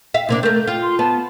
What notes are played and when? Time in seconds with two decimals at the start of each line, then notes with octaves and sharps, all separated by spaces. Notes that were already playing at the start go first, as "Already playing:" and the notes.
0.14 E5 F5
0.29 C3 A#3 D4
0.43 A3 A#4 G6
0.67 F4
0.82 C6
0.99 B3 A5